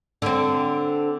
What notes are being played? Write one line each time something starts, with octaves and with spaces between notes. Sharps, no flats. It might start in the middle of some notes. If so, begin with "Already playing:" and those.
D3 C4